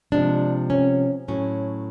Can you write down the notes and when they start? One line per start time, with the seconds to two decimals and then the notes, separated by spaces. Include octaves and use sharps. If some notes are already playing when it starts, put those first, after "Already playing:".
0.12 C3 F3 G#3 D4
0.70 C#4
1.28 A2 F#3 C#4